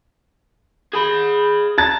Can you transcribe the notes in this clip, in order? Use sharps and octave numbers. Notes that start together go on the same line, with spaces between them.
G#4 B5
A5 A#5 A6